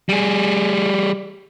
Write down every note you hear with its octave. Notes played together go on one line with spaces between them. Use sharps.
G3 G#4